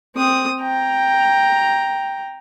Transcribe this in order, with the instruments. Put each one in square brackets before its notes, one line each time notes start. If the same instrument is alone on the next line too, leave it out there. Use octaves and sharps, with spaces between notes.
[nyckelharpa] C4 D#6
G5 A#5